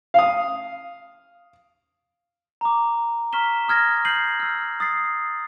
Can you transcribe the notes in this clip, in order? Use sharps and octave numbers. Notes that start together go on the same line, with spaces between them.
F5 D#6
A#5 D6
A#5 C#6 F6 B6 E7 G7
C#6 D#6 F6 G#6 A#6
G6 C7 D#7 F#7
E6 F6
D#6 A6 C7